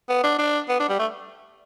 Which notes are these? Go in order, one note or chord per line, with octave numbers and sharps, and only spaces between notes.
B3
D4
D4
B3
D4
G3
A3